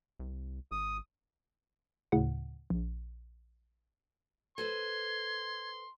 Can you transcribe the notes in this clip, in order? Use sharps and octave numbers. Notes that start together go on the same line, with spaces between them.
C2
G#1 D#6
D2 A2 C#3 F#5
A#1
A4 B4 C5 C6 G#6